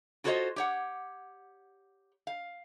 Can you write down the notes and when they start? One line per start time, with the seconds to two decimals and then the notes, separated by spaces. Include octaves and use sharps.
0.24 F4 F#4 A4 C5 C#5 D#5
0.56 G4 C#5 F#5
2.27 F5